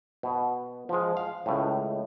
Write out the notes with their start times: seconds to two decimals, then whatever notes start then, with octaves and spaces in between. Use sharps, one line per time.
0.23 B2
0.89 F3 G#3
1.17 F5
1.46 C#2 A2